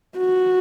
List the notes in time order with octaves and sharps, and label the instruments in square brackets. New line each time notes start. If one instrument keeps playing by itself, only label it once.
[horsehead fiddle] F#4